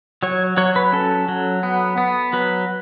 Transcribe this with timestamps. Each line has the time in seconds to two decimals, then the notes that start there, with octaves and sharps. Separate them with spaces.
0.23 F#3 C#5
0.57 F#3 C#5
0.76 B4
0.93 C#4 A4
1.29 F#3
1.63 B3
1.98 B3
2.33 F#3 B4